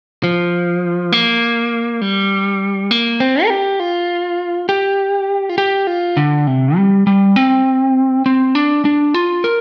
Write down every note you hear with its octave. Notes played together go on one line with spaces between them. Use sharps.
F3
A#3
G3
A#3
C4
A#4
G4
F4
G4
F4
G4
F4
D3
C3
G3
G3
C4
C4
D4
D4
F4
A#4